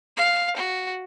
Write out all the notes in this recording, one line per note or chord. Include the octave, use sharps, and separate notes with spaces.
F5
F#4